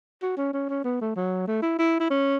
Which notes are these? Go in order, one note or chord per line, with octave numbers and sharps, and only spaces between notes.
F#4
C#4
C#4
C#4
B3
A3
F#3
A3
E4
E4
E4
C#4